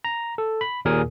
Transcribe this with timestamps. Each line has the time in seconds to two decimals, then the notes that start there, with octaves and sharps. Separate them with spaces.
0.04 A#5
0.38 A4
0.61 B5
0.85 D#2 A#2 G#4 A#4 G#5 D#6